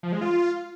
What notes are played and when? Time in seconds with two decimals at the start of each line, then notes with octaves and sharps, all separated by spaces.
0.03 F3
0.12 G#3
0.21 F4